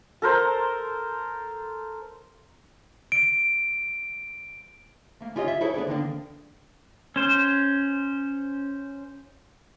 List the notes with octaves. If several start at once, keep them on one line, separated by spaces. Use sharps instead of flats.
A4 A#4 C5 A#5
D7
A3 A#3
C#4 E4 F4 G4 C#5 D#5
E5
E4 F#4 G#4 A4 C5 C#5
B3 D4 C#5 D5
D3 D#3 A#3 D4
C#4 C5